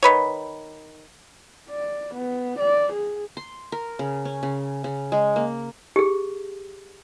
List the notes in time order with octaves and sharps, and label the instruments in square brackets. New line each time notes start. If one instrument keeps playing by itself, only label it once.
[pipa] D#3 B4 C#5
[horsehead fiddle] D5
B3
D5
G#4
[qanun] C6
A#4
C#3
C#4
C#3
C#3
G#3
A#3
[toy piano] G4 G#4